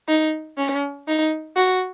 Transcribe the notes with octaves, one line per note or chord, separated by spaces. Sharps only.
D#4
C#4
D#4
F#4